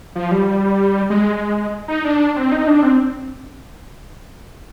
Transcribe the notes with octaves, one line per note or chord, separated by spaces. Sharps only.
F3
G3
G#3
D#4
D4
C4
D#4
D4
C4